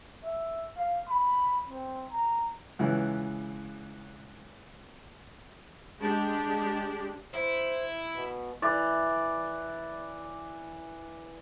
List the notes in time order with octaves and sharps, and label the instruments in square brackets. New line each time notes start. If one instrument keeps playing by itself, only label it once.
[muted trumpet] E5
F5
B5
C4
A#5
[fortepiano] C#2 E3
[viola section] G#3 D4 G4
[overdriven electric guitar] E4 [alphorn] C5
[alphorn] B2
[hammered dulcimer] E3 D5